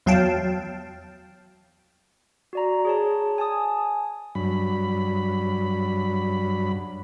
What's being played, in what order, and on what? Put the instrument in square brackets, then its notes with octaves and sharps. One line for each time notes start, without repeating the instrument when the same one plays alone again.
[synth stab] E2 F#3 F5 G5 A5
[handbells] F#4 D5 A#5
G#4 C#5 A5
G#5 A5 D#6
[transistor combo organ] G2 F#3 B5